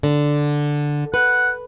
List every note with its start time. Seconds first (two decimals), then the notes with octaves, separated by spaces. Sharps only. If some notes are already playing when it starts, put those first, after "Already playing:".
0.03 D3
1.14 B4 F#5